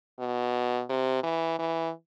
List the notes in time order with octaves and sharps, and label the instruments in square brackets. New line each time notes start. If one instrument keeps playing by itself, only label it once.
[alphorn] B2
C3
E3
E3